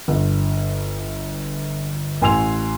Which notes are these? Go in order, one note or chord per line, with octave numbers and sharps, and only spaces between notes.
G1
A1 G#5 C6 E6 F7